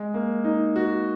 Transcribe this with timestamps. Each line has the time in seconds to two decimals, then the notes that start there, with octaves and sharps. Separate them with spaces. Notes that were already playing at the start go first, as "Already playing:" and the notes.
Already playing: G#3
0.14 A#3
0.44 D#4
0.76 F#4